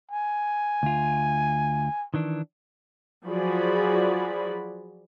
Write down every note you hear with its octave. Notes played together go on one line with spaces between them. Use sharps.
G#5
D2 F4
D#3 E3 D4
F3 F#3 F#4 G#4 D5 B5